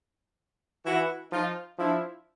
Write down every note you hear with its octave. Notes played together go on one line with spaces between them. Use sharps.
E3 E4 F#4
F3 D#4 F4
F3 D4 E4